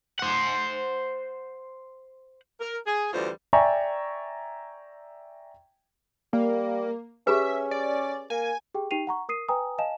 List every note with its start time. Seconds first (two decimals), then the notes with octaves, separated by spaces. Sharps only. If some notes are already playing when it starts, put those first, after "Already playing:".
0.19 C5 F#5
2.61 A#4
2.87 G#4
3.13 D2 E3 G3 F4 C5
3.53 D5 E5 G5 G#5 A#5 C#6
6.33 G3 A#3
7.27 C#4 G4 G#4 B4 E5
7.71 D5
8.30 A#3 G#5
8.75 G4 G#4 G5
8.91 D#4 G4 G5 C7 D#7 F7
9.07 F#5 A#5 C#6
9.29 A#4 D#6 C7 D#7
9.49 B4 G5 G#5 A#5 D#6
9.78 D#5 F5 G#5 A5 E7